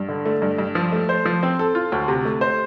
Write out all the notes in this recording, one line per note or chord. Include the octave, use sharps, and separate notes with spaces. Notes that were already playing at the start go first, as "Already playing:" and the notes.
Already playing: G2
D3
A3
G2
G2
F3
A3
C5
F3
C4
A4
F4
D2
C3
A3
C5